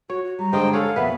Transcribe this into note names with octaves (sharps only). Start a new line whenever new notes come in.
F#4 C#5
F#4
G3 A#5
G2 D3 G#3 C5 D#5 G5
G#4 A4 C#5 F5 F#5
F2 B2 A#3 B3 B4 E5